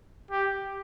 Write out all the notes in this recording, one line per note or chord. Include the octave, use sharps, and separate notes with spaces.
G4